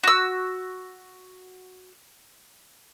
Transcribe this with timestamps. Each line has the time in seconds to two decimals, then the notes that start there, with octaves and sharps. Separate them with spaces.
0.04 F#4 E6